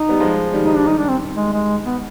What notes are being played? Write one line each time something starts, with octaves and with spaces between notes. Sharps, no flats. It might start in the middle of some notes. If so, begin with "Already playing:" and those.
Already playing: D#4
G3 B3
F3 G#3
D#3 G3
D#3 G3 D#4
D4
D#3 G3 D#4
D4
C4
G#3
G#3
B3